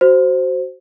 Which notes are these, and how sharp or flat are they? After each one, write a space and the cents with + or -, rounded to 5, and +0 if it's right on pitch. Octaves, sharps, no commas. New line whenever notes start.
F#4 +20 C5 +0